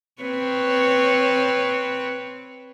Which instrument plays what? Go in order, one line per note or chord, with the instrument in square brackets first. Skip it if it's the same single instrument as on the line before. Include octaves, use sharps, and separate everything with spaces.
[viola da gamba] C4 B4 C#5